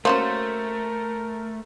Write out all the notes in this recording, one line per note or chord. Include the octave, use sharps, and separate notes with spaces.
A3 A#3 C#4 F#4 A#4 C5